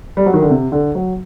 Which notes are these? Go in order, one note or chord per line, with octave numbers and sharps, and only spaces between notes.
G3
F#3
D#3
D3
C3
D3
F#3